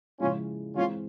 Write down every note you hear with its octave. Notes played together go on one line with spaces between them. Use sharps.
C#3 F3 G#3 C#4 E4 F4
E3 G#3 C4 C#4 F4